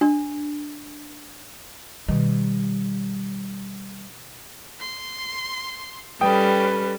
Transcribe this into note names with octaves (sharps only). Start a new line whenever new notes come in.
D4
B2 D#3 G3
C6
G3 C#4 A4 B4 G5 D#6